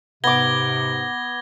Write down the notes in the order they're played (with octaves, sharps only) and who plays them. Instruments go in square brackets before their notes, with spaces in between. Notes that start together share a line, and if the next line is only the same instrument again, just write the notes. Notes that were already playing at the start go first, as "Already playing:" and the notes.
[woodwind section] G#2 C3 [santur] B3 D6 [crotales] G#6 A#6 G7